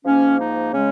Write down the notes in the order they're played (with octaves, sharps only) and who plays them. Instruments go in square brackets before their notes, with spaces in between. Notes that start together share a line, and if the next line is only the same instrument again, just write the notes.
[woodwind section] G#2 F3 A#3 C#4
D#4
C#3 G#3 C#4